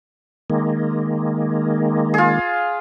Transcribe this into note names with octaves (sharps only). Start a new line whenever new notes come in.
D#3 G#3 A#3
F4 G#4